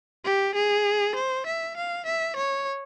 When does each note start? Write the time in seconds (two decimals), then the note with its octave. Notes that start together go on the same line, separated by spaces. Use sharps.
0.25 G4
0.55 G#4
1.15 C5
1.46 E5
1.77 F5
2.06 E5
2.36 C#5